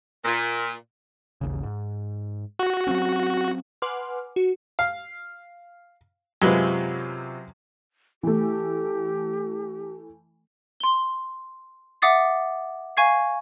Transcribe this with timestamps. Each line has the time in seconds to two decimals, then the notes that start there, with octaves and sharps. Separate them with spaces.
0.25 A#2
1.41 A1 D#2 C#3
1.63 G#2
2.59 F#4
2.87 F#3 C4 C#4
3.82 B4 F#5 G#5 C6 D6 F6
4.36 F#4
4.79 F5
6.42 F#2 C3 G#3 F4 B4 G7
8.23 E3 A3 G4
10.80 C6 G7
12.02 E5 F#5 D6 D#6 A6 C7
12.97 F5 G#5 C#6 G#6 C7